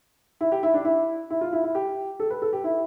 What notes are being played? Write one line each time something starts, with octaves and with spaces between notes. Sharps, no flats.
E4
G4
E4
D4
E4
E4
F4
E4
E4
G4
A4
B4
A4
G4
E4